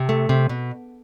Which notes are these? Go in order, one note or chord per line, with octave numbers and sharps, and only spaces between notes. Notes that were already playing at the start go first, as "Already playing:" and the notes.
Already playing: C3
A3
C3
B2